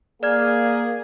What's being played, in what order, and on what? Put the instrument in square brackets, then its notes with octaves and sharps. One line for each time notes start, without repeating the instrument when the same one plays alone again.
[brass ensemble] A#3 G#4 [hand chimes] D5 F6 G#6